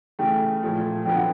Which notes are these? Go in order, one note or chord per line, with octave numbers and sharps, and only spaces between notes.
C#3 E3 A3 G5
A#2 F3 A3
F2 D3 F#3 B3 G5
F#5